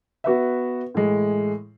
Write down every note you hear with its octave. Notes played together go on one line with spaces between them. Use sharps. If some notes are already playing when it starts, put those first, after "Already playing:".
B3 F#4 B4 E5
A2 E3 G#3